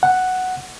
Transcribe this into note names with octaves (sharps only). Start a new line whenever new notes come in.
F#5